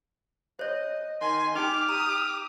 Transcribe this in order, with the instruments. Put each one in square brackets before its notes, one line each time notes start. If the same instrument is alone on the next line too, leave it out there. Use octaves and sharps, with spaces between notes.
[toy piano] C5 C#5 [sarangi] D#5
[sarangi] D#3 [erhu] G#5 [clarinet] C6
[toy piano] D#4 G5 [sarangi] G4 [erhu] D6 [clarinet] F6
[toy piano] A#5 [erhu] D#6